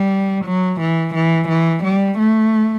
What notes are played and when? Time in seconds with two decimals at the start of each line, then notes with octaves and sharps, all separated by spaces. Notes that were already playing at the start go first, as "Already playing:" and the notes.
Already playing: G3
0.45 F#3
0.79 E3
1.14 E3
1.48 E3
1.83 G3
2.18 A3